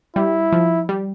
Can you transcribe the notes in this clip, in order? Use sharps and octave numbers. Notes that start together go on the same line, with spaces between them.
G3 E4
F3
G3